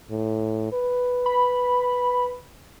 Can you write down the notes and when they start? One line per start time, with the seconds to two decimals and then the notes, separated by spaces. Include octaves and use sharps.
0.11 A2
0.72 B4
1.26 B5